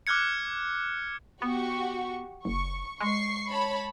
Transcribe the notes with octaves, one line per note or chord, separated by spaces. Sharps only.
D6 F6 F#6 G#6 C#7
B3 F#4 G4 C#6
F#1 C#6
G#3 C#6 C7
C#5 A5 B5